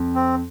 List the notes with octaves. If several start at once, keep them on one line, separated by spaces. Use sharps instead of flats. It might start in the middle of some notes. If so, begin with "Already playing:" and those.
Already playing: F2
C4